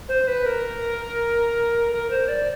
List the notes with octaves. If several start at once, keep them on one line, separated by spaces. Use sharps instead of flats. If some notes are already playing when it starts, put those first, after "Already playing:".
C5
B4
A#4
A#4
C5
D5